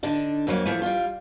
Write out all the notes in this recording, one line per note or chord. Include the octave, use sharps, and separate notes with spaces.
D3 D4 D#4
F2 F#3 A#3
E3 F3 A3
G3 F4